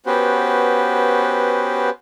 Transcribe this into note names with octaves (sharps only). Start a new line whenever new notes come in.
B3 C#4 F#4 G4 B4 C5